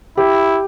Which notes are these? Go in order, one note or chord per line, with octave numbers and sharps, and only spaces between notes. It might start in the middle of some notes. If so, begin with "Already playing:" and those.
E4 G4